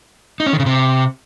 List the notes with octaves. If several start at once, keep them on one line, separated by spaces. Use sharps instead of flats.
D#4
C#4
D#3
C#3
C3